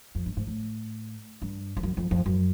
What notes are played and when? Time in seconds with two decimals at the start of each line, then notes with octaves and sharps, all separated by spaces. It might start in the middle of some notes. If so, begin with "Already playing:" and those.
0.15 F2
0.26 G2
0.37 G#2
0.47 A2
1.42 G2
1.77 F2
1.83 F#2
1.97 F2
2.11 F2
2.26 F#2